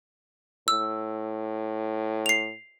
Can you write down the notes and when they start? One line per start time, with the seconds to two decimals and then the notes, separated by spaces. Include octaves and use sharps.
0.68 A2 E6
2.26 C7 F7